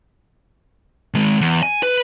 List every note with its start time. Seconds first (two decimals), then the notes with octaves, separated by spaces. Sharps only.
1.14 D#3 G#3
1.41 E2
1.63 G#5
1.83 B4